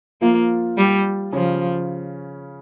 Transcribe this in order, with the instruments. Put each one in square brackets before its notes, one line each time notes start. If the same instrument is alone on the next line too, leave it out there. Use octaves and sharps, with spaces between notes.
[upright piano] F3 F4 [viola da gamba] A#3
[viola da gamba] G3
[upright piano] C#3 C#4 [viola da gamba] F3